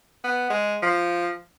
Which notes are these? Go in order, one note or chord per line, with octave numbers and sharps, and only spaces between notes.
B3
G#3
F3